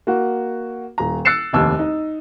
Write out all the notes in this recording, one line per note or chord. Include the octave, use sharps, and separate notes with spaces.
A#3 F#4
D#1 A#5
E6 F#6 A6 C7 C#7 E7
F1 D#2 E6
D#4